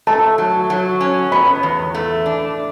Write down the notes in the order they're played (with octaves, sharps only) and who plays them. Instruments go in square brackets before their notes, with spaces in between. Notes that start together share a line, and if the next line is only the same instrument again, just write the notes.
[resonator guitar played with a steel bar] A3 [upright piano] A5
[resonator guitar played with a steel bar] F#3
F#3
C#4
[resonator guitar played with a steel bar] B3 [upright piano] B5
[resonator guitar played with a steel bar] E2
A3
D4